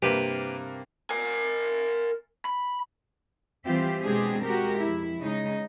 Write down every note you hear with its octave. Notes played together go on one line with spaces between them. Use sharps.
G2 C3 A#3 G4 B4
A#4 G#5
B5
E3 G3 C4 F4 G4 E5
B2 G#3 C4 D4 G4 G#4
G#3 F#4 G4 A#4
F2 E4
C#3 G#3 D#4